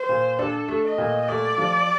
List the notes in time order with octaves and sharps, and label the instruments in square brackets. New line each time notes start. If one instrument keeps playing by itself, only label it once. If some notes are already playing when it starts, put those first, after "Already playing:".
Already playing: [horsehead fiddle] C5
[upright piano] A#2
[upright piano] D4 [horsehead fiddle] A4
[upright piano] A3
[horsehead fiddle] D#5
[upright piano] A#2
[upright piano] A3 [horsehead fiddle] D5
[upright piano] F3